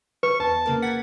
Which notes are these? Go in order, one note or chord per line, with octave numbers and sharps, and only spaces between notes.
B4 C#6
E2 B4 A5
C#3 A#3 A#4
F#5 G#6 A6 B6